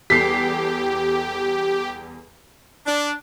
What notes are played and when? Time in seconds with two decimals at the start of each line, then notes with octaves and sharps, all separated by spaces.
0.10 E2 G3 G4 A4 B6 C7
2.86 D4